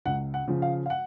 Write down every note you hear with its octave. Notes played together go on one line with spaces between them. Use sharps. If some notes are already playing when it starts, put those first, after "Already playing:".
C#2 F#5
F#5
C#3 F3
F5
F5
F#5